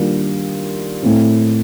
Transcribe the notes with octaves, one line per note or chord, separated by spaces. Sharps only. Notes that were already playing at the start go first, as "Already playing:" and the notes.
Already playing: D#3 G3 A#3 D4 F4
A2 A3 C4